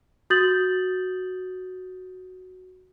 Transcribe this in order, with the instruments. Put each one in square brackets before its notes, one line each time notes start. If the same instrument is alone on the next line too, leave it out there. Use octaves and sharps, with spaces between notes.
[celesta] F#4 D#6 G6 A6 F#7